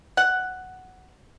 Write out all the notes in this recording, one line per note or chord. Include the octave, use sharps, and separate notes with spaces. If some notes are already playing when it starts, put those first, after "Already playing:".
F#5